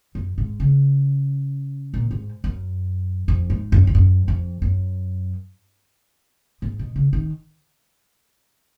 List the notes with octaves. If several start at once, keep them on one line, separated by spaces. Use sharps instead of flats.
F#2
G#2
C#3
A#2
G#2
F#2
F2
G#2
F#2
F2
F#2
F2
F#2
G#2
B2
C#3
D#3